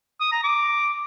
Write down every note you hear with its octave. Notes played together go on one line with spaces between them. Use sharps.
D#6
A#5
D6